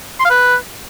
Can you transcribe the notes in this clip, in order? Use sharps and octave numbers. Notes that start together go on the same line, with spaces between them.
C6
F5
B4